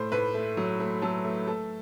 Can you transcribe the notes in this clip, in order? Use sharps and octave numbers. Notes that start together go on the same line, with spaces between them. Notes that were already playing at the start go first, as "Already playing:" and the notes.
Already playing: A2 A3 C5
A2 B4
A3
F#3
A3
F#3 A4
A3
A3 A4